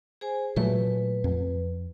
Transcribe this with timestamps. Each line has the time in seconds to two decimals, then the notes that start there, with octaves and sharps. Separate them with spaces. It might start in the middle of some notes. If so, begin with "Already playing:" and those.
0.21 G#4 C5 G#5
0.56 A#2 F#3 A3 B4
1.24 F2